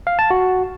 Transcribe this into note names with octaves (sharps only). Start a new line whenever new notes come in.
F5
A5
F#4